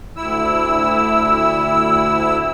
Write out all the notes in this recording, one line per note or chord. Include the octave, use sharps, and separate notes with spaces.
D2 E4 E6